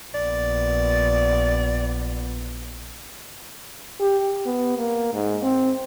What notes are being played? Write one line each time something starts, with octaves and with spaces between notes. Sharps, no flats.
A#1 B3 D5
G4
B3
A#3
G#2
C4